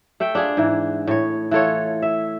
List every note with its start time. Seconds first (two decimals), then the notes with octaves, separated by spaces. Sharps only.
0.20 A3 E5 G5
0.35 D4 F4 G#4
0.57 G#2 E3
1.07 A2 C#5
1.51 E3 F4 A4 C#5
2.02 E5